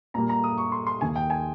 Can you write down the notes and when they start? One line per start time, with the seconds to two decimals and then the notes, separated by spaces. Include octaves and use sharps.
0.14 A#2 G3 A#3 A#5
0.29 A#5
0.44 D#6
0.58 C#6
0.72 C6
0.87 C6
1.01 D#2 D#3 A#3 G#5
1.16 G5
1.30 G#5